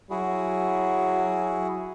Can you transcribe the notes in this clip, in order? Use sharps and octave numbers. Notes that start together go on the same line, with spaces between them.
F#3 E4 F#4 G#4